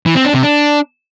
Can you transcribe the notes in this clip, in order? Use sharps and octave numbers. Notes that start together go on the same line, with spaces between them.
E3
C4
D4
C3
D4